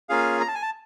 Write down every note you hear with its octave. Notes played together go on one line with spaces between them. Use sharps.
A#3 C#4 F4 G#4 F5
A#5
A5
G#5
A5